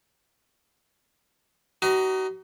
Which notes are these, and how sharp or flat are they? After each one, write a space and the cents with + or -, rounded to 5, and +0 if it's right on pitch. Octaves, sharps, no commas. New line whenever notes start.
D#4 +0 F#4 +40 B4 +40